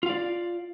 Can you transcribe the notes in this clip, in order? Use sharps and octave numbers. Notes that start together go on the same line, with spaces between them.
F4 D5 F5